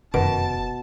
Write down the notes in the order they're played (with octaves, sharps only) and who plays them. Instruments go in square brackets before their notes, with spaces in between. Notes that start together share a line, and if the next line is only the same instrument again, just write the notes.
[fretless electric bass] F1 [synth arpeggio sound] F#2 D#3 D7 [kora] B2 [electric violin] A5